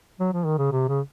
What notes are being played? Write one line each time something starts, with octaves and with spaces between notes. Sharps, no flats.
F#3
F3
D#3
C#3
C3
C#3